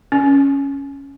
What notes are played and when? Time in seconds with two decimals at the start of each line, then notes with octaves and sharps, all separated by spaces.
0.12 C#4